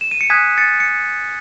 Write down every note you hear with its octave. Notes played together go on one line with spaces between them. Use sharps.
E7
D#7
C#7
G#5 D#6 F#6 G#6 B6
A6 C#7
C#7